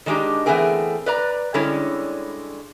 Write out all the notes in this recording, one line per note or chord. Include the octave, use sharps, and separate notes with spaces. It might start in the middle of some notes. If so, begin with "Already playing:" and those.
D#3 G#3 D4 D#4 G4
E3 A3 B3 C4 G#4 A#4
B4 D5 A#5
D3 G3 G#3 C#4 E4 C#5